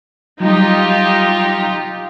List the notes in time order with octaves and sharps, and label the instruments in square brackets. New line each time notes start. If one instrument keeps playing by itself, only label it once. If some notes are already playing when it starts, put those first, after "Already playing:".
[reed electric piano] F#3 G3 [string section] D#4 F4 G4